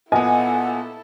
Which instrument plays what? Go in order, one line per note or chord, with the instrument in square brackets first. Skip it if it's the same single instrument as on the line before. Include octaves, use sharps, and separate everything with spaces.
[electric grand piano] A#2 B3 [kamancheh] E4 A4 [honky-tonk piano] D#5 G#5 [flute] F#5